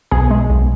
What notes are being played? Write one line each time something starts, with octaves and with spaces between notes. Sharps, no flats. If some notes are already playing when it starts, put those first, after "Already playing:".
B1 G#4
G#3
B1